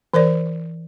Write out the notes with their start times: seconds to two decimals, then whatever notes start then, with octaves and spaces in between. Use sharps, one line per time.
0.14 E3 A#4 C5 D5